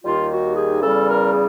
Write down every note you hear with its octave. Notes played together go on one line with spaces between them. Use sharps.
D#2 D#3 G3 F4
F#4
G#4
E2 C#3 E3 G3 A4
A#4
G#4